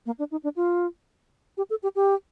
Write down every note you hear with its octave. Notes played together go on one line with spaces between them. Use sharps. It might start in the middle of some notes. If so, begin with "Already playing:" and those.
A#3
D4
D#4
D4
F4
G4
A4
G4
G4